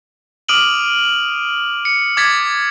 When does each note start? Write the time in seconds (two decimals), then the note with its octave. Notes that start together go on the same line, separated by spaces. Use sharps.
0.49 D6 D#6 F6 D7 D#7 F#7
1.85 C#7
2.17 D6 G#6 A6 B6